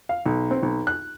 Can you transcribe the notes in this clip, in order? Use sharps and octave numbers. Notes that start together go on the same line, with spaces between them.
F5
B1
C4
B1
F#6